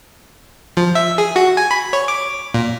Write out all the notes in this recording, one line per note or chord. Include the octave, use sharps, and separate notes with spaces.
F3
E5
G#4
F#4
G#5
B5
C#5
D6
A#2